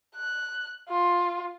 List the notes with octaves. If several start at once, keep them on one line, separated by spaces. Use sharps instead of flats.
F#6
F4